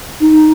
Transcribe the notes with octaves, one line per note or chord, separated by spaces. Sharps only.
D#4